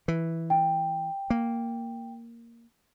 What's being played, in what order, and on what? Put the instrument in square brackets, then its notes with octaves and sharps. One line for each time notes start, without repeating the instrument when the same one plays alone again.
[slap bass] E3
[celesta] G5
[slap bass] A#3